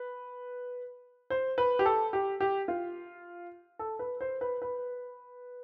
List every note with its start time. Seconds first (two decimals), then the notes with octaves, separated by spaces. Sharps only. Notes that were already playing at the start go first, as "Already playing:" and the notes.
Already playing: B4
1.30 C5
1.58 B4
1.79 G4
1.85 A4
2.13 G4
2.40 G4
2.68 F4
3.79 A4
3.99 B4
4.21 C5
4.41 B4
4.62 B4